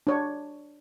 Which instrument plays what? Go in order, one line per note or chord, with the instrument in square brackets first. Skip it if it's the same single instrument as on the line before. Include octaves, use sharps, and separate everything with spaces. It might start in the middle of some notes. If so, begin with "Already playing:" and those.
[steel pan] D4 C#5